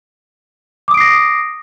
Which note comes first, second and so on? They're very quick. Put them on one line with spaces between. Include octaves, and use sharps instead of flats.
D6 D#6 D7 C7 A#6